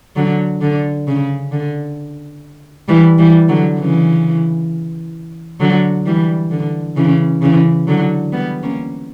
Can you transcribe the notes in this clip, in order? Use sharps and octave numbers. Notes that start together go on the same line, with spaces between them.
D3 F#3
D3
C#3
D3
E3 G3
E3 G3
D3 F#3
C#3 E3
D3 F#3
E3 G3
D3
C#3 E3
C#3 E3
D3 F#3
G3 B3
A#3 C#4